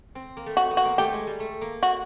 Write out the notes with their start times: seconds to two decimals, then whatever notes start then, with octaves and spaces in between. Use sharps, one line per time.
0.15 C4
0.37 A#3
0.46 A3
0.57 F#4
0.71 B3
0.77 F#4
0.85 A#3
0.98 A3 G4
1.13 G#3
1.27 G3
1.40 A3
1.61 A#3
1.83 F#4